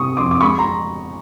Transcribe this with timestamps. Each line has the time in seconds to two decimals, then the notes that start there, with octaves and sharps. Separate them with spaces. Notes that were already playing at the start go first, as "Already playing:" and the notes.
Already playing: C3 G3 C#6 D#6
0.17 F2 C6 D6
0.31 D6
0.41 G#3 B5 C#6
0.58 A#5 C6